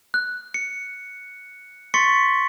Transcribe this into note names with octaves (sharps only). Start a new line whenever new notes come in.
F#6
C#7
C6 C#6 A6 B6 C#7